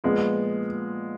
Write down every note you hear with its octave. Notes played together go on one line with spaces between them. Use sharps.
A#2 F3 G#3 B3 F4